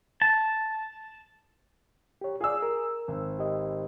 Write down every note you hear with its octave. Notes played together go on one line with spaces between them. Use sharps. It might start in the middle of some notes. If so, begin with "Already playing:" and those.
A5
G4 C#5
F4 G#4 D5 E6
A#4
G#1
G4 D#5